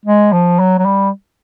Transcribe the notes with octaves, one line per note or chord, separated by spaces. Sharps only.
G#3
F3
F#3
F#3
G3